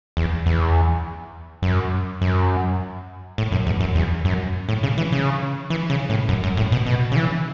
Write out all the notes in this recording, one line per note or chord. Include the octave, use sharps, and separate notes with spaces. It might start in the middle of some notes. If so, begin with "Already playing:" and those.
E2
E2
F#2
F#2
A2
F#2
E2
F#2
E2
F#2
A2
C#3
E3
C#3
E3
C#3
A2
F#2
F#2
A2
B2
B2
C#3
E3